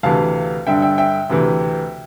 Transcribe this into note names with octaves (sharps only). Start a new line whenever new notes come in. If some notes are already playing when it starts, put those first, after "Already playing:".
D2 C3 E3 F5 A5
G2 D3 E5 G5
E5 G5
E5 G5
D2 C3 E3